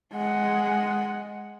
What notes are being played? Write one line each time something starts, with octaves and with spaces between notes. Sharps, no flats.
G#3 F#5